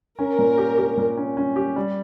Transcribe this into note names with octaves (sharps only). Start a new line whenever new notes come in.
C#4 A#4
A#2
G4
G4
A#2
C#4
C#4
G4
G3